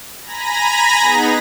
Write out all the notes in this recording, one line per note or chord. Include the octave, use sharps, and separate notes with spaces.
G#5 A#5 B5 A#6
B3 D#4 G#4